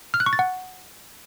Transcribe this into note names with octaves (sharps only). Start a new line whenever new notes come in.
F6
F#6
C#6
A6
F#5